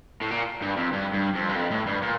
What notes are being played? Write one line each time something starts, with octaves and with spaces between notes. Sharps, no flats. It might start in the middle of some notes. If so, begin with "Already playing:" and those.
A2
A#2
G2
F2
G2
G2
F2
G2
F2
A2
G2
A#2